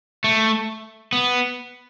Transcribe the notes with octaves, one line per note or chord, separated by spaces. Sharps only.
A3
B3